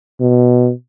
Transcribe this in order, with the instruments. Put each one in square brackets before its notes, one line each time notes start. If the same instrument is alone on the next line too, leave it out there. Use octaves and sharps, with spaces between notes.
[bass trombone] B2